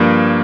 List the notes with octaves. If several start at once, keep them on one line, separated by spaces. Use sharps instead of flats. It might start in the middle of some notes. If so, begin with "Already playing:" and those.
Already playing: G2 F3 A#3